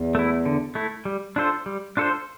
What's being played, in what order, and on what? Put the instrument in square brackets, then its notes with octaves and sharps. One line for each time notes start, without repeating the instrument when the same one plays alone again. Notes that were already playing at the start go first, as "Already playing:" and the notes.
Already playing: [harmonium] E2
[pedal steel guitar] A3 E4
D3
A3 E4
G3
D4 F4 A4 C5
G3
D4 F4 A4 C5